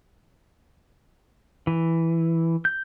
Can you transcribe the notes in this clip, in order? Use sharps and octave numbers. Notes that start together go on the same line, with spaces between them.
E3
G6